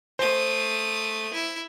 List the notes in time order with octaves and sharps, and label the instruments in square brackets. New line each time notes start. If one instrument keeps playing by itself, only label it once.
[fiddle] A3 D#6 [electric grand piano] C5
[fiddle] E4